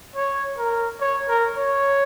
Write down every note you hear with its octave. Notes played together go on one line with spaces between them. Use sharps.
C#5
A#4
C#5
A#4
C#5